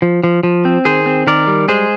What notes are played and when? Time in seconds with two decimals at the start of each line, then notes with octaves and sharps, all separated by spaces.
0.02 F3
0.24 F3
0.43 F3
0.65 C4
0.85 D#3 G#4 C5
1.06 C4
1.27 D#3 A#4 D5
1.47 G3
1.68 G#3 G#4 C5